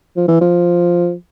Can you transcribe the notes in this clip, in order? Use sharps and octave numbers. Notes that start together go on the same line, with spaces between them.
F3
E3
F3